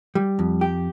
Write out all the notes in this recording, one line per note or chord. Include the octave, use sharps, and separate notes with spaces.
G3
F2
G4